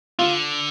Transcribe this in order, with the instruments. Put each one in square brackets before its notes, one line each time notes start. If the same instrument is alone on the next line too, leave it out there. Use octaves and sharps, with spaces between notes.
[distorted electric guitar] D3 [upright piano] F4